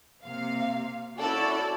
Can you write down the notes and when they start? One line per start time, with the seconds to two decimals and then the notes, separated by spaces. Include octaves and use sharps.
0.24 C3 A#3 F5
1.19 C#4 E4 F#4 A4 D5